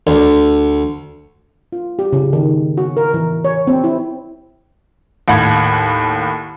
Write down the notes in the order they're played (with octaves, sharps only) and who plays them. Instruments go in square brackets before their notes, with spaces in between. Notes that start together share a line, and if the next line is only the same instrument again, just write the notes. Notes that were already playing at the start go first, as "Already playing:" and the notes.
[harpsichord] D2
[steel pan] F4
G4
C#3
D#3
F#4
A#4
E3
C#5
C4
E4
[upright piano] D#2 A2 F#5 B5 G#6